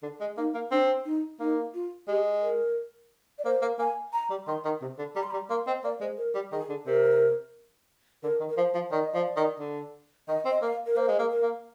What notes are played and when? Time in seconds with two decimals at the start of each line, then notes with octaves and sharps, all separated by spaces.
0.03 D3
0.21 G#3
0.37 A#3 D#4
0.54 A#3
0.71 C4 D4
1.05 D#4
1.40 A#3 D#4
1.74 F4
2.08 G#3 G4
2.42 A#4
3.39 D5
3.45 A#3 C5
3.62 A#3
3.79 A#3 G#5
4.13 A#5
4.30 G3
4.47 D#3 C6
4.65 D#3
4.82 C3
4.98 D3
5.15 G3 A#5
5.23 C6
5.31 G3 A#5
5.50 A#3 C6
5.67 C4 D#5
5.84 A#3 D5
6.01 G#3 C5
6.18 A#4
6.35 G3
6.52 D#3 G#4
6.69 D3
6.87 C3 A#4
8.23 D3 A#4
8.40 D#3
8.49 A#4
8.57 F3 C5
8.75 F3
8.91 D#3 D5
9.03 D#5
9.14 F3 D5
9.37 D#3
9.59 D3
10.28 D#3 D#5
10.45 C4
10.51 D#5
10.62 A#3 F5
10.86 A#4
10.97 A#3 C5
11.08 G#3
11.19 A#3
11.31 A#4
11.42 A#3